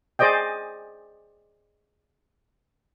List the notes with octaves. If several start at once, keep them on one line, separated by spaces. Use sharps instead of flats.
G#4 C5 D5 D#5 G5